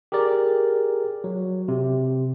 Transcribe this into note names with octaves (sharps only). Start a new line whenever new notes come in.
G4 G#4 A#4 D5
F#3
C3